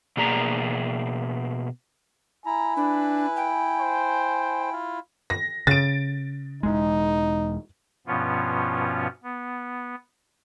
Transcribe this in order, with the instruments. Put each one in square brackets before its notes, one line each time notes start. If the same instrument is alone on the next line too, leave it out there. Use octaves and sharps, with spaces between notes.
[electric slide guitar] B2 A#3 G#4 D5 A#5
[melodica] E4 [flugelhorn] G#5 [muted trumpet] A#5
[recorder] D4 [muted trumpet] B4
[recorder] G5
[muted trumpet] C5
F4
[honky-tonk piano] A#6
[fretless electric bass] C#3 [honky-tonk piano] A6 D7
[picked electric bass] E1 D#2 G#3 [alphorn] D#4
[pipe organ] G2 B2 F3 B3 C#4 F4
B3